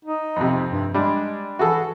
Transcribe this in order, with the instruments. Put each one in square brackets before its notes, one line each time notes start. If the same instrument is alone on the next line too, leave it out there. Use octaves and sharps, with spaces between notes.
[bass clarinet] D#4
[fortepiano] F2 C3
[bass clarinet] G2
[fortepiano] G3 D4 [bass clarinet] G#3
[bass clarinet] E3 [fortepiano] F#4 G#4 A4